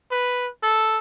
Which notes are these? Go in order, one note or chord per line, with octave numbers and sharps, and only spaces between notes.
B4
A4